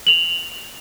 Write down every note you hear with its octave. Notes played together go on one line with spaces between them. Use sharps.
F7 F#7